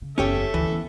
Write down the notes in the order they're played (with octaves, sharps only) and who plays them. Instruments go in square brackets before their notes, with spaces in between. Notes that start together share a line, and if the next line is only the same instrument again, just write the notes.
[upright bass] C#3
[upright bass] F#1 E2 [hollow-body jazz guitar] C#4 G4 C#5 [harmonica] A4 E5
[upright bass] D2 [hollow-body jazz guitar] E3
[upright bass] B3 C#4